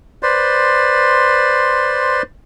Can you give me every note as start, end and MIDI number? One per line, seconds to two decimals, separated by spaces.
0.23 2.22 71
0.23 2.22 72
0.23 2.22 74
0.23 2.22 84